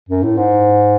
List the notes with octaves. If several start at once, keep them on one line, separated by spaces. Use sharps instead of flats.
F#2
A2
G#2